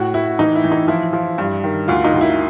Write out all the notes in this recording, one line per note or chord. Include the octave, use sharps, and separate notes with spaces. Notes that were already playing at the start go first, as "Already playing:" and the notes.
Already playing: A2 F#4
A2 E4
E3 D#4
E4
E3
D#4
F3 E4
F3
G2
D#3
D2 F4
D#4
D2
E4